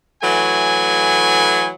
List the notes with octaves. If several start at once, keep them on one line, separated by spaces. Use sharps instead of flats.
E3 F#3 A3 G#5